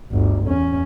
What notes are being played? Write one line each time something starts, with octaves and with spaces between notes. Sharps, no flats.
G1 D2
E2 C#4